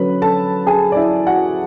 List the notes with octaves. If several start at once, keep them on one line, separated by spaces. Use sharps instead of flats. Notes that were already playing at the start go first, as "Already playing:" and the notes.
Already playing: D3 F#3 C#4 B4 B5
A4 A5
G#4 G#5
D5
E4 E5
F#4 F#5